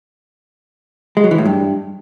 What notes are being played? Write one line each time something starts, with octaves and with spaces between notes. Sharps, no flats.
G#3
F#3
E3
A2
G2